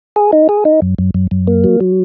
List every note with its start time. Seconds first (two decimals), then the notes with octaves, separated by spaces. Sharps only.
0.16 G#4
0.32 D#4
0.49 G#4
0.65 D#4
0.82 F#2
0.98 F#2
1.14 F#2
1.31 F#2
1.47 A#3
1.64 F#3
1.80 F#3